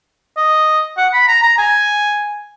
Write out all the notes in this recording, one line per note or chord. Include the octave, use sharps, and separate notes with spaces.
D#5
F#5
B5
A#5
A#5
G#5